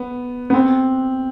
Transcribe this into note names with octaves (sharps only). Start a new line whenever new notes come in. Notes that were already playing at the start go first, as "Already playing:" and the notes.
Already playing: B3
B3
C4